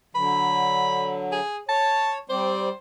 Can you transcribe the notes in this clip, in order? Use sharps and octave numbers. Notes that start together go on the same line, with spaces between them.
D3 F#3 B5
G#4
C#5 A5
G3 C4 C5 D5